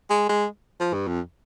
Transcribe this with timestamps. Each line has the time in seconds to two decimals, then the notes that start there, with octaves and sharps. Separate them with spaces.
0.10 G#3
0.29 G#3
0.80 F3
0.94 G2
1.07 F2